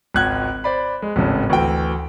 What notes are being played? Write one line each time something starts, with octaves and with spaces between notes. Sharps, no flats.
G#1 C#2 F#6 G#6
C5 D5 B5
G#3
G#1 A2 C#3 A4
D2 E3 F#4 G5